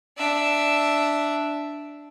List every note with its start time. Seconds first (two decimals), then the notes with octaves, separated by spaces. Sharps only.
0.18 D4 E5